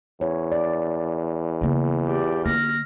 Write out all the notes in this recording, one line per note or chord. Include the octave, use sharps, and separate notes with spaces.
E2 C#5
D5
C#3 A#3
G4 D5
D3 A#3 F6 A#6